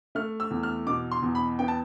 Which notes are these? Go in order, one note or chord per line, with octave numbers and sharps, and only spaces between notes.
A3 F6
E6
E2
F6
B2 D6
C6
E2
B5
B3 G5
A5